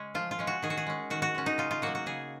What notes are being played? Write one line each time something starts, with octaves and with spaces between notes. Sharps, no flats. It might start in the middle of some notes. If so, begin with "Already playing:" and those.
Already playing: C#3 G#3 C#4
F3 F4
F4
G#3 C#4
F#4
D#3 G#4
F#4
G#4
G#3 C#4
D#3 F#4
F#4
G#3 C#4
D#4
C#3 F4
F4
F#3 A#3 F#4
F#4
C#3 G#4